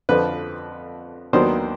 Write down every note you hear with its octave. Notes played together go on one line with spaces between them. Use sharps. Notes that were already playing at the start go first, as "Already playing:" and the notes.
F2 D3 F3 B4
D#2 D#3 F#3 B3 D4 C5